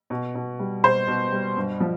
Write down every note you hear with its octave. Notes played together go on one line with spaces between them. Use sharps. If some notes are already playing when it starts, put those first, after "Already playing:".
B2
B2
G3
B2 C5
B2
G3
G2
F3